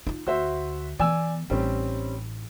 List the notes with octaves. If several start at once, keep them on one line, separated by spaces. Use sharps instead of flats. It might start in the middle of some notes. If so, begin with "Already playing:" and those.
D#4 F4
D2 F#4 C5 E5
E3 B3 D5 G#5 E6
A1 G3 C4 C#4 D#4